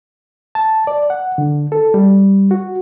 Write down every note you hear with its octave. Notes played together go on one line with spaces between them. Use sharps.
A5
D5
F#5
D3
A4
G3
F#4